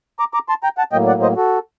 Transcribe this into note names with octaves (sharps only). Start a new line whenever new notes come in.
A#5 D6
A#5 D6
A5 C6
G5 A#5
F#5 A5
A2 F#3 A#3 D#5 G5
D5 F#5
C5 D#5
F#4 A4